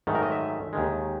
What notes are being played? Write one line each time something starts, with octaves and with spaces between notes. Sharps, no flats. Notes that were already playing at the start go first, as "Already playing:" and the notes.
G#2 D#3 F#3 A3
A#4
D#5
E5
D#2 D#3 G#3